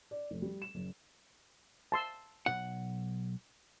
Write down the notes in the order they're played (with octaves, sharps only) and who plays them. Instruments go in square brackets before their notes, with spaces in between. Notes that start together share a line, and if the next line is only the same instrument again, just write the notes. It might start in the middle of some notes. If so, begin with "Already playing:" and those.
[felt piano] D5
F1
G3
E7
F#1
[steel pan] A5 C6 E6
[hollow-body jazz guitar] B1 G#2 F#5